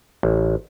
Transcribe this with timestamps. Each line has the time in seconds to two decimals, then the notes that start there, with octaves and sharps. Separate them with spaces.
0.23 A1